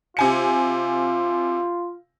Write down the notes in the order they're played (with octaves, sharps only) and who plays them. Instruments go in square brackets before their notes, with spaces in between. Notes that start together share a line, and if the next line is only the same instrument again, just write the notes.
[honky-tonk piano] C3 G#5 C#7 [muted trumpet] F4